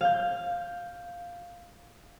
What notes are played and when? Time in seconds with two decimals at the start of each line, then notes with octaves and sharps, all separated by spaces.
0.01 F5 G6